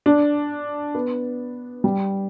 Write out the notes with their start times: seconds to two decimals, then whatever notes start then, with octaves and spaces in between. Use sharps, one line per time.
0.06 D4
0.95 B3
1.84 G3